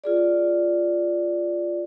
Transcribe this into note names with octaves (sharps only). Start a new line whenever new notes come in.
F4 G#4 D5